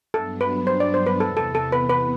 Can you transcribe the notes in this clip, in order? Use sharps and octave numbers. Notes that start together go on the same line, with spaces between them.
G2 F#3 B3 D4 A4
B4
C5
D5
C5
B4
E2 C3 E3 B3 A4
A4
A4
B4
B4